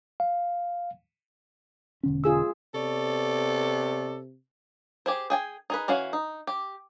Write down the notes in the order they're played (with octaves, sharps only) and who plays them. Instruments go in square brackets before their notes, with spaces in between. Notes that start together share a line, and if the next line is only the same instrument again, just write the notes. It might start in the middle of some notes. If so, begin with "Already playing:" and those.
[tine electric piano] F5
[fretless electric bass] E1 D3 C#4
[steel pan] F4 G#4 E6
[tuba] C3 [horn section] B3 C#5 D5 [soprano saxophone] A4
[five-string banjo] G4 G#4 C5
G#4 G5 G#5
D#4 G#4 B4
E3 C#4 F#4 F5
D#4
G4